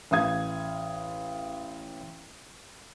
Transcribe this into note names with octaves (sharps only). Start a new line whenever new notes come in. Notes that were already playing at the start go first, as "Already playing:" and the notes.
A1 F5 D#6 G#6